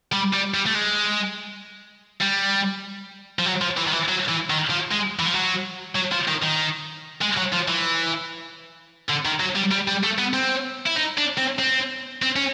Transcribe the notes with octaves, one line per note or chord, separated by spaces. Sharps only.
G3
G3
G3
A3
G#3
G3
F3
F#3
F3
E3
D#3
E3
F#3
E3
D#3
F3
G#3
E3
F3
F#3
F#3
F3
D#3
D#3
G#3
F#3
F3
E3
D3
D#3
F#3
G3
G3
G3
A3
B3
C4
E4
D#4
D4
C4
C4
C4
C#4